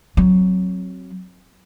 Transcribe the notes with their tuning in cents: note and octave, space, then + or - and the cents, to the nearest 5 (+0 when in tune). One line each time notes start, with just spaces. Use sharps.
F#3 +0 C4 +15